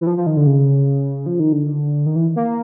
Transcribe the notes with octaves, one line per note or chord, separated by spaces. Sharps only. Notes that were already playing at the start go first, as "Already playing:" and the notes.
E3
F3
F3
D#3
D3
C#3
F3
D#3
D3
D#3
E3
A#3